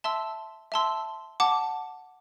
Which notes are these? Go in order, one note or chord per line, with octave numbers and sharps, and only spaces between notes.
E5 A5 C6 E6
E5 A5 C6 E6
F#5 A5 D6